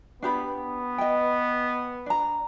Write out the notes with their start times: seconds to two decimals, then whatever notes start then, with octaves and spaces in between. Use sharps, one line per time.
0.22 B3 D4 G4 B5
0.54 B3
0.98 D#5 G5
2.06 D4 A#5